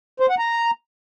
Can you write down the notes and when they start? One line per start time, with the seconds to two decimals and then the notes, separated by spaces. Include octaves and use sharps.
0.20 C5
0.29 F#5
0.39 A#5